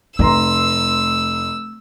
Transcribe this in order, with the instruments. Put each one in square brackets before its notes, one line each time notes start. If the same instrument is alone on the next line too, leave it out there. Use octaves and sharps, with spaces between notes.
[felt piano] F1 A#5 C6 [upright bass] A3 [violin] E6